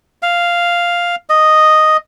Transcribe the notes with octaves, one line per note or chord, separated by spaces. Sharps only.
F5
D#5